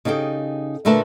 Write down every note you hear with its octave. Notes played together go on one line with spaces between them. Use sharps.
C#3 D#4 G4 A4 G5
A#2 D3 A3 A#4 B4 A5